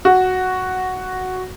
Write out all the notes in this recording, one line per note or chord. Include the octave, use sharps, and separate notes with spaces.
F#4